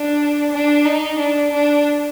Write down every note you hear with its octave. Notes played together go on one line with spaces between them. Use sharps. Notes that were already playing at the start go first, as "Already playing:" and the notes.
Already playing: D4
D4
D#4
D4
D4